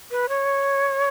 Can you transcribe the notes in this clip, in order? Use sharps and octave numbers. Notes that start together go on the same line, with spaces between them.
B4
C#5